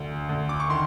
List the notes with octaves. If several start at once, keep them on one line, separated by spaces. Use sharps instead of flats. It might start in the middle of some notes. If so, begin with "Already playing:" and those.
Already playing: D2
D2
D6
C#6
D#3 C6